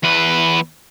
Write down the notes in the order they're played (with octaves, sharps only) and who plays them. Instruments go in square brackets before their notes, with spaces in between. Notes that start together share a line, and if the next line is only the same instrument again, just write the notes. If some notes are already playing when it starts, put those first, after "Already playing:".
[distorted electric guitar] E2 B4